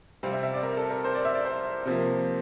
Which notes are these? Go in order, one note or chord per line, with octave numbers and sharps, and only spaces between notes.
C3 G3 C4 F5
E5
E5
D5
A#4
A4
A#4
C5
D5
E5
D5
C5
C3 F3 A#3